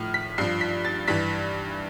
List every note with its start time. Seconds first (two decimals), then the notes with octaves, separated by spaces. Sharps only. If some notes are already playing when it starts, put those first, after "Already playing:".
Already playing: A2 F3 F6
0.14 B6
0.38 G2 F3 C7
0.61 B6
0.85 A6
1.08 G2 E3 B6